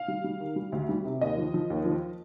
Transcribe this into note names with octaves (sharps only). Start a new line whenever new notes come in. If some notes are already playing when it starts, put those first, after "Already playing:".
Already playing: F5
G3
G3
D#3
G3
D2
G3
C3
D#2 D#5
F3
F3
D#2
F3